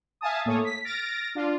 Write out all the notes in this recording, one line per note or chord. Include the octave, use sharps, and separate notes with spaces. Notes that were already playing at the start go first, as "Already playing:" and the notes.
E5 F5 G#5 A5 D#6
A2 A#3 A4 C#5 D#6
B6
F6 A6 A#6 D7
D4 F4